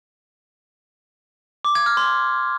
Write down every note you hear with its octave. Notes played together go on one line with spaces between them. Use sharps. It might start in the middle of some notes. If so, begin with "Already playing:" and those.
D6
G#6
F6
C6